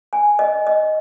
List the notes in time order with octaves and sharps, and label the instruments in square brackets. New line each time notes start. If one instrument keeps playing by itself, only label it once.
[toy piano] G#5
D#5
D#5